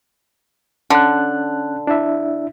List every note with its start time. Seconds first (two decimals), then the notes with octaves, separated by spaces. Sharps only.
0.90 D3 C#4 F#6
1.87 D4 E4 E5